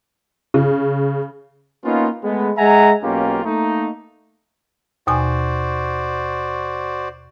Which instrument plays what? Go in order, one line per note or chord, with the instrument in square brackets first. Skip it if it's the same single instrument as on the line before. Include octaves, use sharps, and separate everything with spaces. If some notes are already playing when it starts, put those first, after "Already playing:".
[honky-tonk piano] C#3
[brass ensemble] A#3 B3 C#4 D#4 F4
G#3 A3 B3
G#3 E5 F#5 G#5 A#5
B1 A#3 C#4 D#4 F4 G4
A3 A#3 D#4
[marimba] D#2 B2 G#5 [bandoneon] F#4 C5 D5